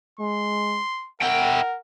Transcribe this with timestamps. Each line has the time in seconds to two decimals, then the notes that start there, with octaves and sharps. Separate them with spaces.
0.20 G#3 C6
1.21 E4 A#4 F#5 G5